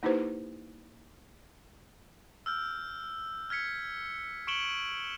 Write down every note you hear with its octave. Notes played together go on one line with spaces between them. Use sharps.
A#3 D#4 E4 G4 B4 C5
E6 F6 G6
F6 G#6 B6 C#7
C#6 C#7 D7 E7 F#7 G7